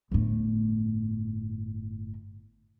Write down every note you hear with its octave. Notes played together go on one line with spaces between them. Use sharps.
G1 A2